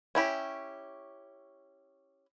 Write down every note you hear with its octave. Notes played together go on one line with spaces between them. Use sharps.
C#4 E4 G4